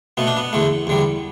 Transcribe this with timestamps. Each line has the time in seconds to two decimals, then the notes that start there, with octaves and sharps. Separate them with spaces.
0.17 B2 A3 B3
0.27 D4
0.37 B3
0.53 E2 D3 A3
0.87 E2 D3 G3